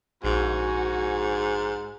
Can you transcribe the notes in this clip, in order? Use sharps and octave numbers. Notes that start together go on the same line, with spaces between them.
A#1 G#2 F#4 G#5